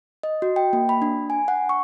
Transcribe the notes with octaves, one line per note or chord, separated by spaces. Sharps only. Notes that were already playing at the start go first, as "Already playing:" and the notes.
D#5
F#4
G5
A#3
B5
D4
G#5
F#5
C#6